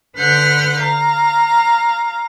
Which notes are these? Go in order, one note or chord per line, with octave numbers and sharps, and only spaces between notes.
D3 B4 F#5 F6 G6
F5 A#5